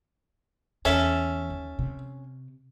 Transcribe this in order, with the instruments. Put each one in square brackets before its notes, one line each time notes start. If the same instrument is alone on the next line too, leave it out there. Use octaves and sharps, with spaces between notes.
[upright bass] E2 [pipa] C#4 [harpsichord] A4 E5 A5
[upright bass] D#2
C3